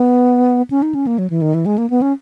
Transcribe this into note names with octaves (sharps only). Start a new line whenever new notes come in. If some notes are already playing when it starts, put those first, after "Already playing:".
Already playing: B3
C#4
D#4
C#4
A#3
F#3
E3
D#3
E3
G#3
A#3
B3
C#4